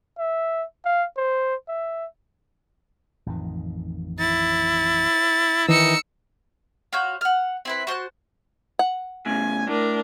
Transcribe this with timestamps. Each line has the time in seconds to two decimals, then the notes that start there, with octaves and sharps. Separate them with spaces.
0.18 E5
0.85 F5
1.17 C5
1.68 E5
3.26 A1 F2 D#3
4.19 E4 A6
5.68 D#3 E3 D#4 E6 C#7
6.93 F4 F#4 C#5 G6
7.21 F#5 F6
7.65 C4 E4 B4
7.87 F#4 C5 A5 F#6
8.79 F#5
9.26 A2 C#3 G#5
9.68 A2 D4 A#4